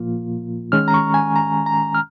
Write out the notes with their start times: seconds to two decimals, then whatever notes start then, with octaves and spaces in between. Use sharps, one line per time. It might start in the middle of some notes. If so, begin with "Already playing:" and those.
Already playing: A#2 F3 A#3 F4
0.72 D#3 G#3 C#4 F6
0.88 A#5
0.94 C#6
1.14 G#5
1.36 A#5
1.66 A#5
1.94 F6